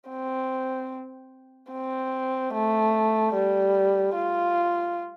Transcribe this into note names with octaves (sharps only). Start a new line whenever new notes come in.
C4
C4
A3
G3
F4